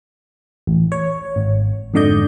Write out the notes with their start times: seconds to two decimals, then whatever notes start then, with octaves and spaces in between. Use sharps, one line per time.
0.67 A1
0.92 C#5
1.36 G#1
1.94 F2 G#2 D3 D5 D#5 G6